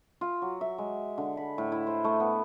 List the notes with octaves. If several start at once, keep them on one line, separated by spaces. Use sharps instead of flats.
F4
F#3
E5
G#3
D3
B5
A2
E4
C5
A3
B3